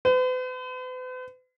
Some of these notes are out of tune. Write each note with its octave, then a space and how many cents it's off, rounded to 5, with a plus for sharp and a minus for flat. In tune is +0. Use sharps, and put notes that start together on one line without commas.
B4 +45